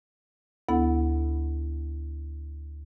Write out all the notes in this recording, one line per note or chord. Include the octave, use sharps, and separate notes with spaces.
D2 B3 E4 A4 F#5 B5